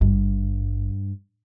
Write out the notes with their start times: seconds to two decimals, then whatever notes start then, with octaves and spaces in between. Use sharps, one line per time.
0.01 G#1 G2